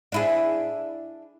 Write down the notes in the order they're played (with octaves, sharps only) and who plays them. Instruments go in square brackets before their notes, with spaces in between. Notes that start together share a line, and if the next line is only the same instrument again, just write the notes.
[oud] D4 E4 G#4